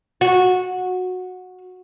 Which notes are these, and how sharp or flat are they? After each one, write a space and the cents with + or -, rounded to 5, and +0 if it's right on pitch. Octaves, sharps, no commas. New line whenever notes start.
F#4 -15